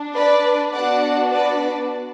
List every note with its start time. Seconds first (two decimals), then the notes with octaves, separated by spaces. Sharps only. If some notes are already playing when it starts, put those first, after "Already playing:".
Already playing: D4
0.15 B4 D5
0.73 B3 D4 F#4 D5 F#5
1.30 B4 D5